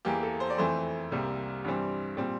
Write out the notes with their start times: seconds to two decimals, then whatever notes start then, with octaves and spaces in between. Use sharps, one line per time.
0.05 E2 E3 A#3 G4
0.22 A4
0.40 C5
0.50 D5
0.58 F2 E3 A3 C4 C5
1.11 C2 C3 G3 A#3
1.64 G2 E3 G3 C4
2.17 A#2 G3 C4